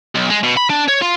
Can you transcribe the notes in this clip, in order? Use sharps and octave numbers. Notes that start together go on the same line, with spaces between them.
B1
G#3
B2
B5
D4
C#5
F4